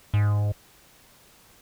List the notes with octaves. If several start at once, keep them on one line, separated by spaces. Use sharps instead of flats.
G#2